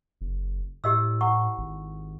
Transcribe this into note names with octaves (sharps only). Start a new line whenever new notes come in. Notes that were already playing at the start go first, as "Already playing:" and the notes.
F#1
A2 G4 D#5 E6
E4 F#5 C#6
G#1